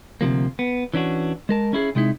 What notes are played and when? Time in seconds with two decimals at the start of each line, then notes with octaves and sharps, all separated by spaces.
0.21 D2 C3 F3 A#3
0.59 B3
0.94 E3 C#4 D4 F#4
1.49 G#3 A#4 A5
1.73 C#4 E4 G#4
1.95 C3 G#3 D#4 E4